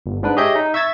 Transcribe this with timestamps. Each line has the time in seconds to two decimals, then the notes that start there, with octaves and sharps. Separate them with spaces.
0.06 G1
0.23 G#2 D4 B4
0.37 G4 G#4 C#5 D#5 E5 G6
0.56 D#4
0.74 E5 C#6 E6 G#6 A6